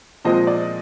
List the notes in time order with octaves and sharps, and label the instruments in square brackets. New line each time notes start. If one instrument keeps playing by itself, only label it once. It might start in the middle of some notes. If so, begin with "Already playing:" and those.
[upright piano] A#2 F3 G#3 C4 D#5
D5